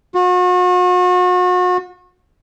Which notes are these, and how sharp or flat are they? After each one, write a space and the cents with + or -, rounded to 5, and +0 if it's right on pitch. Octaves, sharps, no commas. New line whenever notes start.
F#4 -40